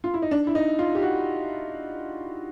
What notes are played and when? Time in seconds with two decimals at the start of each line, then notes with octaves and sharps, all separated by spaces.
0.04 F4
0.14 E4
0.22 D#4
0.31 D4
0.47 E4
0.55 D#4
0.79 F4
0.95 G4
1.02 F#4